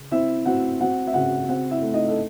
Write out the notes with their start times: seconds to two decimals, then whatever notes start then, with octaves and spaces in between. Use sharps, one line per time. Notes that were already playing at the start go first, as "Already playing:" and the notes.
Already playing: C#3
0.11 C4 E4 E5
0.45 C4 F#4 F#5
0.80 C4 F#4 F#5
1.07 E5
1.14 C#3 F#4 F#5
1.48 C4 F#4 F#5
1.71 E4 E5
1.82 A3
1.93 D#4 D#5
2.08 A4